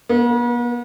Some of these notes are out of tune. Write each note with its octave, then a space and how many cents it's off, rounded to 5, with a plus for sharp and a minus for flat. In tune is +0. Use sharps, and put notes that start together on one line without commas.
B3 -45